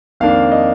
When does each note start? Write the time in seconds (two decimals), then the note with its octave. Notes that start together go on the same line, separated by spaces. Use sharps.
0.20 F2 D#3 A#3 D4 F5
0.52 D#5